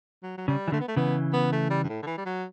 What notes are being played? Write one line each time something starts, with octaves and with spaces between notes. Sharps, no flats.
F#3
F#3
C#3 G3
E3
D3 A3
B3
A3
C#3 E3 B3
B3
A3
G3
G2
A2
D3
E3
G3
F#3